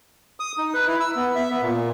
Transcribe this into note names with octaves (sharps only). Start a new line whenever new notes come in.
D#6
D#4
B4
E4
E6
B3
E5
B3
A#2